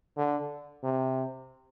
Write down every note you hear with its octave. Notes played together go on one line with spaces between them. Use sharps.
D3
C3